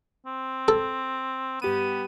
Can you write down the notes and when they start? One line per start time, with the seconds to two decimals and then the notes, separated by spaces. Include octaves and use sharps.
0.27 C4
0.68 A4
1.62 G2 B3 G4 D#7